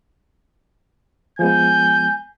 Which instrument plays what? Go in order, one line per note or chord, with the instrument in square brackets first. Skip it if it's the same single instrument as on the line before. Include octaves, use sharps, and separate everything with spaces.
[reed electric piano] F3 G#3 B3 [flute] G#5 [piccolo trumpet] G6